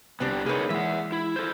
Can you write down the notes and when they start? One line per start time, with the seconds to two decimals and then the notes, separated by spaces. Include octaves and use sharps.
0.20 C2 B3 C4 D4 G4
0.46 A#3 D#4 G#4 B4 C#5
0.70 E3 G#3 E5 F#5
1.12 E4
1.36 A4 C5